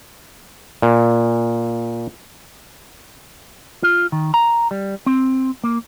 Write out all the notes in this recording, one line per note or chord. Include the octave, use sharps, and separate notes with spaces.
A#2
F4
D#3
A#5
G3
C4
A#3